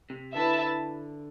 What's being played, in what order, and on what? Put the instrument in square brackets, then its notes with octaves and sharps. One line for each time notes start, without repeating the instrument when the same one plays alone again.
[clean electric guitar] C3
[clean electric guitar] D3 [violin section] E4 B4 E5 A5